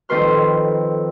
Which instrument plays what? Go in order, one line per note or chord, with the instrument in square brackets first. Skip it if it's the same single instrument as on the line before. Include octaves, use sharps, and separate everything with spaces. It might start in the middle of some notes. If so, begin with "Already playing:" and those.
[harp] F2 D#3 A4 B4 C6 F6